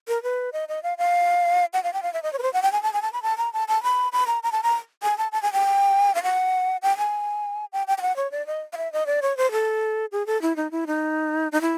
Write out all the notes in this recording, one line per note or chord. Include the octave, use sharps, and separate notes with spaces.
A#4
B4
D#5
D#5
F5
F5
F#5
F5
G5
F5
E5
D#5
C#5
B4
C5
F#5
G5
G#5
A5
G#5
A5
B5
A5
A#5
A5
A5
B5
B5
A#5
A#5
A5
A#5
G#5
A5
A5
G#5
G5
F5
F#5
G5
G#5
G5
G5
G5
F#5
C#5
D5
D#5
F5
E5
D#5
D5
C#5
C5
A4
G#4
A4
E4
D#4
E4
D#4
D#4
E4